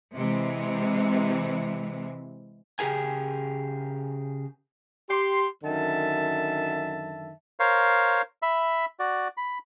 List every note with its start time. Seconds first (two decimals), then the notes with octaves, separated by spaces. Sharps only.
0.14 C3 E3 G#3
2.79 C#3 G4 G#4 A#4 G#5
5.09 G4 C6
5.64 F#2 D3 D#3 E5 A5
7.60 A#4 C5 C#5 F5
8.42 E5 B5
8.99 F#4 D5
9.37 B5